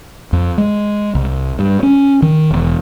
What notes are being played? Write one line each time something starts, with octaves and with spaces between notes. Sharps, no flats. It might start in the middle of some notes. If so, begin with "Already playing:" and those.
F2
G#3
C2
G2
C#4
D#3
E1